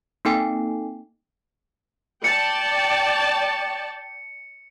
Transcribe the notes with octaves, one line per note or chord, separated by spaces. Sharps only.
A#3 C4 D#4 A4 G5 G#5
D5 G5 A5 C#7